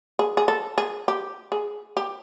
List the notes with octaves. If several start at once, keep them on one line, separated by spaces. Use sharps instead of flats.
G#4
G#4
A4
G#4
G4
G#4
G4